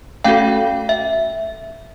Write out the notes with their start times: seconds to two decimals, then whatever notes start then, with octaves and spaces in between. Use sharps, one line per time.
0.24 A3 C#4 F#4 A4 F5 G5
0.89 E5